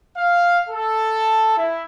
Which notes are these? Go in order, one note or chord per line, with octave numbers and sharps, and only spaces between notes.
F5
A4
E4